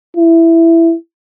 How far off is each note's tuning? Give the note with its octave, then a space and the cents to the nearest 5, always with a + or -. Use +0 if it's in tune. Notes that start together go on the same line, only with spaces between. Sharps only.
E4 +10